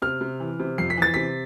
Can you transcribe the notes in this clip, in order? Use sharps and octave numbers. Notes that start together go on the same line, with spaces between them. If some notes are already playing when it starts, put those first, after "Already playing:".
C3 F6
C3
E3
C3
F2 C7
B6
E3 A6
C3 B6